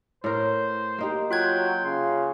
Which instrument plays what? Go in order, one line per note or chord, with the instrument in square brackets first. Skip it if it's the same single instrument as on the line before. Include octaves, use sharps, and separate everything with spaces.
[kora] A2 A#4 [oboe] C5
[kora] A#3 D#4 G4
[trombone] F#3 [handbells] F4 F#6 G#6 [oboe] G5
[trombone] C#3 [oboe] C6